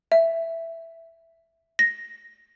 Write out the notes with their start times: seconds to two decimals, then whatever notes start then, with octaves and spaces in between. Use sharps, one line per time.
0.12 E5
1.79 A#6